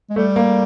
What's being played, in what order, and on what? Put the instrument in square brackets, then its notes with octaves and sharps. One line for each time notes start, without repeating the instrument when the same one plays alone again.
[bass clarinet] G#3
[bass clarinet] G3 [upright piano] A3
[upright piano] A#3